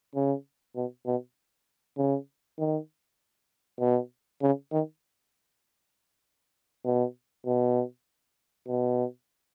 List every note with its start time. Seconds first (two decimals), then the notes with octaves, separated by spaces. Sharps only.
0.15 C#3
0.76 B2
1.06 B2
1.97 C#3
2.59 D#3
3.80 B2
4.42 C#3
4.72 D#3
6.85 B2
7.46 B2
8.68 B2